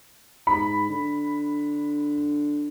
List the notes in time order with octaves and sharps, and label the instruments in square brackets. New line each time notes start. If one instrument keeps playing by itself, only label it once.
[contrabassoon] G#2 [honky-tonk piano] B5
[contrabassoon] D3